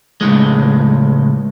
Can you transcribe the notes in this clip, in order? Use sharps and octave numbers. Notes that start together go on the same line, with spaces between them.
C#2 F#2 A2 G#3